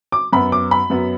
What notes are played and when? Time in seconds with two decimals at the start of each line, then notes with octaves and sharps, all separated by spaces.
0.12 D6
0.33 F#2 F#3 B3 B5
0.52 D6
0.71 B5
0.90 F#2 F#3 B3